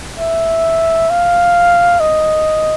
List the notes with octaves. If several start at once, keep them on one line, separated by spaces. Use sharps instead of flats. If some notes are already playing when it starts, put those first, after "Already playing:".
E5
F5
D#5